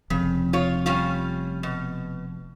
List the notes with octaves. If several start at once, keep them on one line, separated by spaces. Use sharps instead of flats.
F1 F2 C#3
F4 C#5
G3 C#4 F4
B2